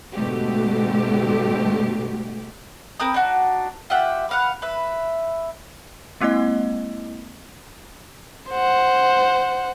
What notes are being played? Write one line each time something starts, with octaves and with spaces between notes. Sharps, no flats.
G#2 B2 D3 A3 F#4 G4
C4 A#4 B4 D#6
D4 D#4 F#4
F4 G4 E5 F#5
B4 F5 F#5
B4 E5
G#3 A#3 C4 E4 D#5
C5 F#5